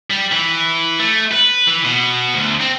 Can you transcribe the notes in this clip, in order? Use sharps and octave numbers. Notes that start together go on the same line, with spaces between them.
G3
E3
A3
B4
E3
B2
D2
C4